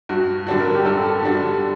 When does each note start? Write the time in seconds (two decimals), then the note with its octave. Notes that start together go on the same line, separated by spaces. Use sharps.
0.09 G2 F#4
0.47 D3 G3 D4 F#4
0.60 A#4
0.75 G4
0.85 G2 A4
1.23 D3 G3 D4 F#4